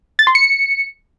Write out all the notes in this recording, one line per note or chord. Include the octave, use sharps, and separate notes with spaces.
A6
C6
C#7